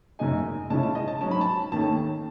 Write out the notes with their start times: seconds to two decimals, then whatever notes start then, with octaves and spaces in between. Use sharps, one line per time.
0.19 F#2 C#3 G#3 D#4 G#5
0.70 C#3 G#3 C#4 E4 A5
0.83 A5
0.95 D#5
1.08 A5
1.21 G#2 F#3 C#4 A5
1.31 B5
1.41 A5
1.72 D#2 D#3 A3 C#4 A5